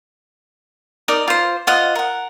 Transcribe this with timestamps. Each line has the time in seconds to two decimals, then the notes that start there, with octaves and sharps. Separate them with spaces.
1.08 D#4 A#4 D5 D#6
1.28 F4 C5
1.67 F4 C5 D#5 F#5
1.95 A#4 F#5